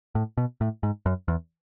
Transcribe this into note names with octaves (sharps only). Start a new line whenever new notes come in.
A2
B2
A2
G#2
F#2
E2